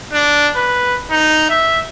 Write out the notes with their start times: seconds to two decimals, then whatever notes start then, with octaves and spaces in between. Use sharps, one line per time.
0.13 D4
0.56 B4
1.11 D#4
1.50 E5